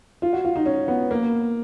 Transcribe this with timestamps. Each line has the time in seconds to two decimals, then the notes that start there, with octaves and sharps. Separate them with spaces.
0.22 F4
0.33 F#4
0.45 F4
0.56 D#4
0.66 C#4
0.88 B3
1.11 A#3